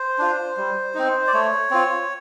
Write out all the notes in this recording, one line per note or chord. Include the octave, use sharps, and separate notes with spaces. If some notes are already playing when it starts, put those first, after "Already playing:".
Already playing: C5
D4 F4
G3
C4 D#4
D5
A3 C#5
C4 F4